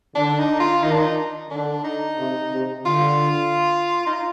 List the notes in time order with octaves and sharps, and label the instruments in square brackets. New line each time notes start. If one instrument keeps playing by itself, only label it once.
[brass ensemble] D3 [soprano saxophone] D4
[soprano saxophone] D#4
F4
[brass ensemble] D#3 [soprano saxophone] D#4
[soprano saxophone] D4
D#4
[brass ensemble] D3 [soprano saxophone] D4
[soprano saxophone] D#4
[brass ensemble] C3
C3
[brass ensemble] D3 [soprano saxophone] F4
[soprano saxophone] D#4
F4